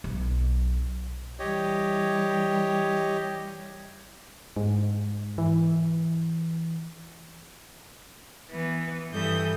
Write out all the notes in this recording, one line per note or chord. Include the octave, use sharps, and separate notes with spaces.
B1
E3 G3 G4 C#5 D#5
G#2
E3
E3 B3
G2 E3 A4 D#6 G6